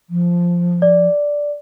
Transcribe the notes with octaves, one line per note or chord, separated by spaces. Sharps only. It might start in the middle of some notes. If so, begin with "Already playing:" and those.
F3
D5